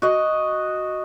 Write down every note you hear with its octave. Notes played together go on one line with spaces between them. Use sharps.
F#4 D#5